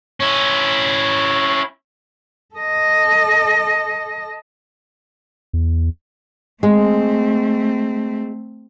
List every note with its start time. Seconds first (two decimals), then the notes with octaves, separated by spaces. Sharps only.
0.20 C#4 E4
2.55 A4 D#5
5.53 E2
6.63 G#3 A3 C4